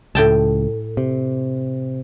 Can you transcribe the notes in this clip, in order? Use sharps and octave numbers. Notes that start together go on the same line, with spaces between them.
C#2 A2 G5 A5
C3